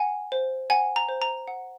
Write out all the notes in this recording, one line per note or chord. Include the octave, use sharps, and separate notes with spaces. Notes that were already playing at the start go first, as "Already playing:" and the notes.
Already playing: F#5 G#5
C5
F#5 G#5
A#5
C5
A#5
F#5